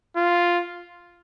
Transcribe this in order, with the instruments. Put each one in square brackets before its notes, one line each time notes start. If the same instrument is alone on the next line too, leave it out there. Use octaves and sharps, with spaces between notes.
[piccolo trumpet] F4